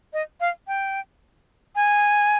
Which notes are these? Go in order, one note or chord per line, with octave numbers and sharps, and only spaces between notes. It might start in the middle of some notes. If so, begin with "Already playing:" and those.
D#5
F5
G5
G#5